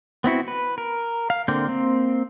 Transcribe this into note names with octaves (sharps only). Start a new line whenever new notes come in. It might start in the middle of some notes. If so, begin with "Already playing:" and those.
B3 C4 E4 F#4
B4
A#4
F5
D3 A#3 C4 G6
A#3 C4